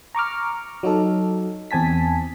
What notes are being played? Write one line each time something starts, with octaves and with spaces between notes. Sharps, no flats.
A#5 C#6 D6 F6
F#3 D#4 A4
E2 C4 G#5 A5 B6